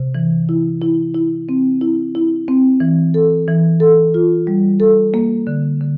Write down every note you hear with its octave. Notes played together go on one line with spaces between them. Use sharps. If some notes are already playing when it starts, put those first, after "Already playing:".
Already playing: C3
E3
E4
E4
E4
C4
E4
E4
C4
E3
A4
E3
A4
F4
G3
A4
A#3
D3
D3